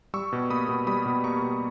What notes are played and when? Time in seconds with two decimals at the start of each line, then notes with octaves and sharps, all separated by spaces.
0.14 G3 C#6 E6
0.32 B2
0.50 A#3 B5 D#6
0.69 B2
0.87 G3 B5 D#6
1.06 B2
1.24 A#3 A#5 C#6
1.42 B2